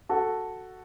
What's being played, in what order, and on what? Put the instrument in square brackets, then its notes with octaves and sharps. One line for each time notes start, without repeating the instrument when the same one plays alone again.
[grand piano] F#4 A4